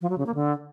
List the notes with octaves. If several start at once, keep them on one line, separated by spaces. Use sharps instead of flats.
F3
F#3
C#3
A#3
D3